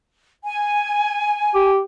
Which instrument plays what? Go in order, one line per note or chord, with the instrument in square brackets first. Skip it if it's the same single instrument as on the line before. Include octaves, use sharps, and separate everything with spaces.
[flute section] G#5
[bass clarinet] G4